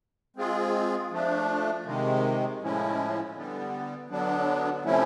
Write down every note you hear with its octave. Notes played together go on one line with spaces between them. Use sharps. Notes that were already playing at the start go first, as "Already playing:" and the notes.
G#3 C4 F4 G#4
F3 A3 D4
C3 D#3 G#3
A2 F3 G#3 C#4 E4
D3 G3 B3
D3 F#3 B3 D4
C3 F3 A3 C#4 E4